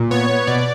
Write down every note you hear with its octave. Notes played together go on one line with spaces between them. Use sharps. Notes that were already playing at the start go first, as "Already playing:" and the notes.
Already playing: A#2
B3 C#5
B3
B2 D5